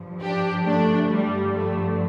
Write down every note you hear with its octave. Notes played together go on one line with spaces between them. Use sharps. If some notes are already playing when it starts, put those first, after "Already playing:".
Already playing: G2 F3
D4 G4
A3 D4
G2 D3 F3 G3
A3